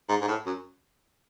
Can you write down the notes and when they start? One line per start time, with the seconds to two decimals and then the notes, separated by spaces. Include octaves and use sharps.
0.09 G#2
0.21 G#2
0.28 A2
0.46 F#2